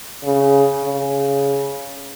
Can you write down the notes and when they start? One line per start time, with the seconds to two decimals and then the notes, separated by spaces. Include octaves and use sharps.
0.24 C#3
0.84 C#3